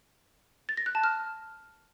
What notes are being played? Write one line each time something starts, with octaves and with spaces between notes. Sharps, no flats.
A6
A#6
F#6
A5
F6